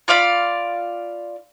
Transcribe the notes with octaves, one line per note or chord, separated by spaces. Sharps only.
F4 D5 F5 B5